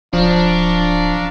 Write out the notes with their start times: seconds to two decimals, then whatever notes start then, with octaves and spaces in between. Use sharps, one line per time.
0.13 D1 F3 D4 F5 A#5 C#6